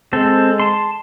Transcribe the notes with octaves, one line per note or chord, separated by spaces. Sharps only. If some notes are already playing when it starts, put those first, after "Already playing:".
G#3 C4 A4
A5 C6